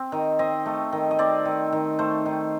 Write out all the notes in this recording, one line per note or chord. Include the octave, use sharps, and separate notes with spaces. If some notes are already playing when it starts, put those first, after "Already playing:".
Already playing: C4
D#3
C4 D#5
A3
D#3
D#5
C4 D5
D#3
D#3
A3 C5
D#3